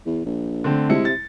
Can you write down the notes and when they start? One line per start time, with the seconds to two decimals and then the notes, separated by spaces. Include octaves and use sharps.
0.06 E2
0.25 A#1
0.64 D3 A3 C4
0.89 C3 G#3 E4 C#7
1.05 A6